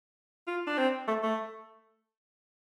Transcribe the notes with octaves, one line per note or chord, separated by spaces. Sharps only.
F4
D4
C4
A3
A3